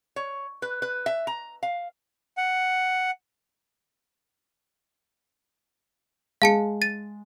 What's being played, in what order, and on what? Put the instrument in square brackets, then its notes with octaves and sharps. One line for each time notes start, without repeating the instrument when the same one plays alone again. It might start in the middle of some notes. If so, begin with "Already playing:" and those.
[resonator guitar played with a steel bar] C#5
B4
B4
E5
A#5
F5
[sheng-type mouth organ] F#5
[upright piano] G#3 [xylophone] F5 A5 C#7
[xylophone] A6 D#7